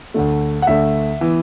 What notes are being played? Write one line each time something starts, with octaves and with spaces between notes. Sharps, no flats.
D2 D3 A3
F#5
D2 D3 A3 E5
E3 B3